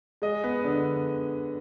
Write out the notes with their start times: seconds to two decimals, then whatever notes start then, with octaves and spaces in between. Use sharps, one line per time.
0.22 G#3 D#5
0.44 B3
0.64 D3